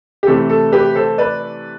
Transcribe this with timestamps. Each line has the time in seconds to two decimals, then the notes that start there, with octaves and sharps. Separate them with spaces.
0.23 G4
0.27 C3 E3 A3 E4 A4
0.49 A4
0.72 G4 B4
0.95 A4 C5
1.18 B4 D5